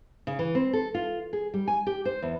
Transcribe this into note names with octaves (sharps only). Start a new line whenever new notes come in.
C#3
E3
C4
A4
F4
G#4
G3
G#5
G4
C5
E2